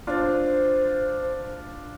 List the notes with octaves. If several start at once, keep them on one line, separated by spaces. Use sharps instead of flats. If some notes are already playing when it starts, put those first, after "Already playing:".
D4 F4 C5 D5